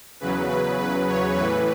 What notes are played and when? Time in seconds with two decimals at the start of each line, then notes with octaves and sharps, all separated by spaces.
0.20 E2 C#3 F#3 B4
0.49 B4
0.79 B4
1.08 C#5
1.37 A2 E3 B4